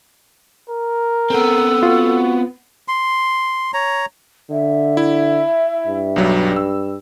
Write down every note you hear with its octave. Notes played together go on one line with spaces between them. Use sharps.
A#4
B3 C4 A4
F4 F#4
C6
C#5 A#5
D3 E5
E4
G2
B1 F#3 G3
E6